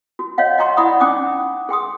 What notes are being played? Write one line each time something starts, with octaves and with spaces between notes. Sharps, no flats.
F#4
C#5 D#5 F5 F#5
D#5 F#5 G5 A#5 C6 C#6
E4 D5 F#5 B5 D#6
C#4 D#4 G5 D6 D#6
G#4 G5 C6 D#6